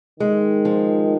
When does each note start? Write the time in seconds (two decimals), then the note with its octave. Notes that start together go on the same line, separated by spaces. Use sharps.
0.20 D#3 G#3
0.65 F3